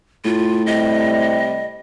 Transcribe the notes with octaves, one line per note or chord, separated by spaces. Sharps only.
A2 F4
C3 G3 D#5